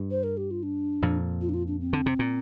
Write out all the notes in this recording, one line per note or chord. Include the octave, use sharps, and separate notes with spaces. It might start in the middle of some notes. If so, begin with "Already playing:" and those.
Already playing: G2
C5
A#4
G4
F4
D4
F2 A#2
F4
D4
F4
D4
C4
D3
C3
A#2